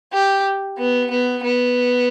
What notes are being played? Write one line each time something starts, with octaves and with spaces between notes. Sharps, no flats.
G4
B3
B3
B3